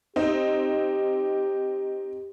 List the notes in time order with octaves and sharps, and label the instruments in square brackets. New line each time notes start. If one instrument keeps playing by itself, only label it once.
[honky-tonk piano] C4 D#4 [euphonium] G4